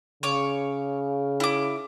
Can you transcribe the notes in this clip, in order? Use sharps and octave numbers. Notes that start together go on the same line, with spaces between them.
C#3 C#5 D6
E4 D6